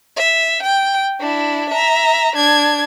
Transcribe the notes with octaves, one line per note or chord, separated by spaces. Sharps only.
E5
G5
D4 E4
E5 A#5
D4 G#6